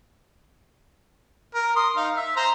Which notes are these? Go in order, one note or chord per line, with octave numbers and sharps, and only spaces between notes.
A#4
C6 D#6
D#4 F5
E5
C5 A#5 C6